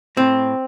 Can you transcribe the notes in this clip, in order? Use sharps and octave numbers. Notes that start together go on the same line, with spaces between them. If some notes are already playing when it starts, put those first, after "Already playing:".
A2 C4